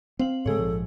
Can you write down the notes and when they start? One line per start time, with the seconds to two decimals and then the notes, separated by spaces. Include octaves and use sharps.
0.19 C4 C5 F5 F#7
0.46 G#2 C#3 G#3 G#4 A4 C#5
0.59 A#1 G#2 F3